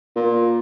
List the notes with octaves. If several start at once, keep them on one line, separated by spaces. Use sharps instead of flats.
A#2